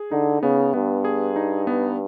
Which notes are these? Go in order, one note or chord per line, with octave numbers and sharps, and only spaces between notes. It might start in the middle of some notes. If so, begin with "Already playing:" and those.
Already playing: G#4
D3 D#4
C#3 B3
G2 B3
G#4
D#4
B3